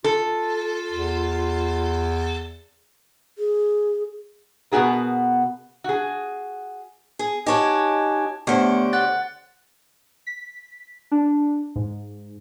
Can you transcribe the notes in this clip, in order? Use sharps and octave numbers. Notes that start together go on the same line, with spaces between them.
F4 A4
E2
G#4
B2 B3 F#4 G#4 A#4
F#4 G#4
G#4
D#4 G4 C#5 D#5 F#5 G#5 A5 D6
D3 A3 B3 G4 C5 C#5 D6 C#7
F#5 F#6 A6
B6
D4
G#2